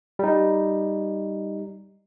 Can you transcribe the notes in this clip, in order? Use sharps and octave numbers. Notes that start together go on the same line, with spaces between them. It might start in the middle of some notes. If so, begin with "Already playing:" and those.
G3 D#4